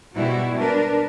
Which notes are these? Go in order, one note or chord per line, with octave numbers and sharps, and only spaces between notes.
G#2 B2 G3 G#3 E4 F#4
D4 A#4 B4